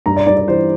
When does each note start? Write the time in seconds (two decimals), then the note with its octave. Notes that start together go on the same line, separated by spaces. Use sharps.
0.06 G2 A#5
0.16 D5
0.27 G2 D5
0.37 D5
0.48 E3 C5